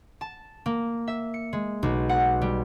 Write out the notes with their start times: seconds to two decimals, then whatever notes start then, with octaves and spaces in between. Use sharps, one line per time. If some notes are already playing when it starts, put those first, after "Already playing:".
0.21 A5
0.66 A#3
1.08 E5
1.34 C#7
1.53 G#3
1.83 B1
2.09 F#5
2.42 G3